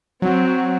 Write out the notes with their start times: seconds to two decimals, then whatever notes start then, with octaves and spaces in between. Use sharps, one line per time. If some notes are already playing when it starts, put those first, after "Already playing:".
0.22 F#3 C4
0.44 F#3